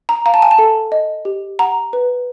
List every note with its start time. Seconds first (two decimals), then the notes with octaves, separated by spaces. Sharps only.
0.09 A#5
0.26 F5 A#5
0.34 A5
0.42 G#5
0.51 A5
0.58 A4
0.92 D#5
1.25 G4
1.59 F#5 A#5
1.93 B4